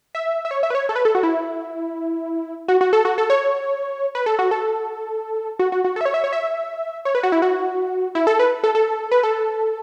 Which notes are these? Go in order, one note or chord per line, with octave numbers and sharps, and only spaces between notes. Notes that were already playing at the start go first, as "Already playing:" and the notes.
E5
E5
C#5
E5
B4
C#5
A4
B4
A4
F#4
E4
F#4
F#4
A4
F#4
A4
C#5
B4
A4
F#4
A4
F#4
F#4
F#4
A4
E5
C#5
E5
C#5
E5
C#5
B4
F#4
E4
F#4
E4
A4
B4
A4
A4
B4
A4